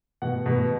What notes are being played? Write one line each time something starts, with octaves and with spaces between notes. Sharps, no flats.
B2 F#5
B2